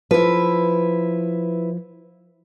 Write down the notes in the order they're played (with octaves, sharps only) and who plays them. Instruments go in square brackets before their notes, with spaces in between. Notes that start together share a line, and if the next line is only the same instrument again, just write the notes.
[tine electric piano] F3 [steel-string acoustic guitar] E4 B4